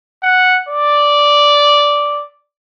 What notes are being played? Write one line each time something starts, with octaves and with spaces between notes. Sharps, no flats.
F#5
D5